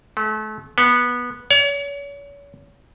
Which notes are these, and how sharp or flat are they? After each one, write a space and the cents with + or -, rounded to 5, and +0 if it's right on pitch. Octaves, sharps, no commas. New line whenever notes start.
A3 -35
B3 -15
C#5 +35